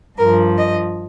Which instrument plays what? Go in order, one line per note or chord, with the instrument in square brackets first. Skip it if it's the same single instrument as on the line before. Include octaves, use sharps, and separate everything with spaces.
[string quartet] G2 F3 A#4
D#5